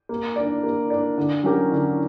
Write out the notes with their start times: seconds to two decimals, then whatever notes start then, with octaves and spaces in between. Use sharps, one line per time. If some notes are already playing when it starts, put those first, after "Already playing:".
0.09 A#3
0.36 D4 A#4 D5
0.64 A#3
0.90 D4 A#4 D5
1.18 D3
1.43 F#3 C#4 G4 A#4
1.71 D3